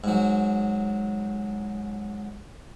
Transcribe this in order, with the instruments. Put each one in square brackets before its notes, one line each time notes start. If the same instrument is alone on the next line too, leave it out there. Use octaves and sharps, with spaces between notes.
[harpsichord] G#2 F#3